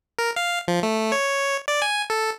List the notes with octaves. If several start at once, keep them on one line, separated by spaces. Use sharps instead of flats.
A#4
F5
F3
A3
C#5
D5
G#5
A4